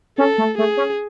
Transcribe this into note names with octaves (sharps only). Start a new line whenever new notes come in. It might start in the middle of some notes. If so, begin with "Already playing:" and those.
C#4 A4
A3
A3 G#4
C#4